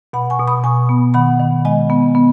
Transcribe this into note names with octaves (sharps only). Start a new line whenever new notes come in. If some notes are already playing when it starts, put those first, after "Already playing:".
B2 F#5 B5
G#5 C#6
B2
B5 D#6
B2 G#5 C#6
B3
D#3 F#5 B5
D#3
G#3 D#5 G#5
B3
B3